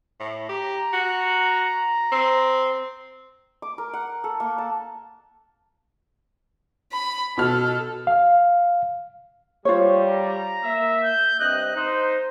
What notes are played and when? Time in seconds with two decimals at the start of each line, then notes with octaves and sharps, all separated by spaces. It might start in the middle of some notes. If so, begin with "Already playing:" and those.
0.20 A2
0.49 G4 A#5
0.93 F#4
2.12 C4
3.62 D6
3.78 A#4
3.93 F#5
4.24 A4
4.40 A#3
4.58 A5
6.92 B5
7.38 B2 A4 F6
8.07 F5
9.65 G3 F4 C5 C#5
10.08 A#5
10.63 A#3 E5
11.04 G6
11.40 G2 C3 D#5 F#6
11.76 D#4 C5